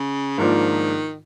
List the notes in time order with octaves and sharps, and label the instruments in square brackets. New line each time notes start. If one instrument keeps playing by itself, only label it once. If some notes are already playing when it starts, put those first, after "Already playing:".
Already playing: [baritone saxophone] C#3
[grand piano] G#2 F3 A#3 D4 F4 [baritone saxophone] D#3